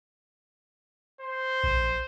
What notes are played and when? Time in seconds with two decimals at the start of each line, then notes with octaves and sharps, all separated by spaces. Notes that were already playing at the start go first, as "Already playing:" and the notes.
1.21 C5
1.64 A#1